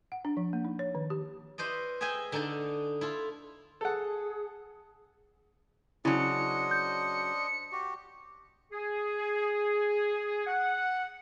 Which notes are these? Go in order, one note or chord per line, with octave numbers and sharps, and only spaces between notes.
F#5
D4
F3
A#3
D#4
C#5
D#3
G4
E4 B4 C5 D5 D#5
G#4 D#5 E5 G5 G#5
D3 D4 D#4 A4 D5
E4 F4 A4
G#4 A4 F#5
C#3 F#3 D4 E4 C5 D#5 C#7
G6
F#4 G4
G#4
F#5